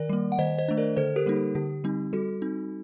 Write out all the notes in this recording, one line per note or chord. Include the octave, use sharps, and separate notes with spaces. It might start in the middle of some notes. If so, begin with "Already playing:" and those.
Already playing: D#3 A#4 D5
G3 A#3
F#5
D#3 C5 D#5
C5 D#5
A3 D4
A#4 D5
D3 A4 C5
G4 A#4
G3 A#3 D#4
G4
D3 G4
G3 C4 D#4
G3 F#4 A4
C4 D#4